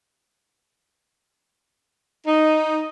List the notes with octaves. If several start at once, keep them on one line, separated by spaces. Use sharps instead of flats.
D#4